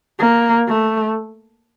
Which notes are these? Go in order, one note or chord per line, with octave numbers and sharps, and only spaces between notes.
A#3
A3